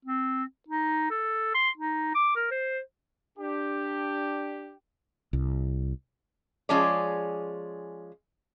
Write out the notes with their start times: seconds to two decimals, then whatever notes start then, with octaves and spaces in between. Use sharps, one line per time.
0.05 C4
0.68 D#4
1.11 A4
1.55 C6
1.77 D#4
2.15 D6
2.36 A#4
2.51 C5
3.38 D4 G4
5.33 C2
6.69 F3 G#3 C#4 G#4 D5